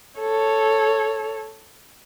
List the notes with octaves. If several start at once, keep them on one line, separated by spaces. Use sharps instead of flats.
A4 C#5